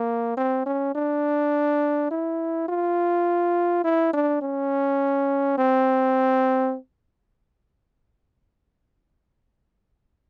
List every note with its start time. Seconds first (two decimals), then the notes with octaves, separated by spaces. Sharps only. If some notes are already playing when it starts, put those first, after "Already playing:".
Already playing: A#3
0.37 C4
0.66 C#4
0.95 D4
2.11 E4
2.69 F4
3.84 E4
4.13 D4
4.42 C#4
5.58 C4